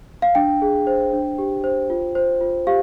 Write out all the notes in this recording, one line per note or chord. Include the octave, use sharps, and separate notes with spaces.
F5
D4 G5
G#4
C5
D4
G4
C5
F4
C5
F4
G4 F5